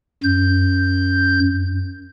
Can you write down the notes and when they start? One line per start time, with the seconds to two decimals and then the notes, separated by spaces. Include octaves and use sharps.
0.23 F#2 G6